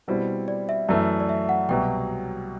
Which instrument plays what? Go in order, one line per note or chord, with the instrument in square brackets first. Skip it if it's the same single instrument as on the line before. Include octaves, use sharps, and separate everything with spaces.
[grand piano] B2 G3 C4 E4
[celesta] D5
E5
[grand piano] F#2 E3 A3 [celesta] D5
[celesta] D5
E5
F#5
[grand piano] C2 B2 F#3 [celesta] G5